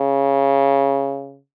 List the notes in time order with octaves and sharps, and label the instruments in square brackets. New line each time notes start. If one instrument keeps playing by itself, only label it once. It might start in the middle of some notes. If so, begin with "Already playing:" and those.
Already playing: [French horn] C#3